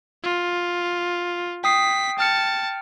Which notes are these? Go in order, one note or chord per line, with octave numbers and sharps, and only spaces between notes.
F4
G5 D#6 B6 C7
G5 A5 F6 C#7